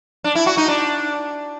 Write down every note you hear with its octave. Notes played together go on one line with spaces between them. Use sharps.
D4
E4
F#4
D#4
D4